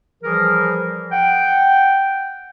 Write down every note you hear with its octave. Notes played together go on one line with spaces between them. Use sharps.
E3 F3 G3 G#4 A#4
F#5 G5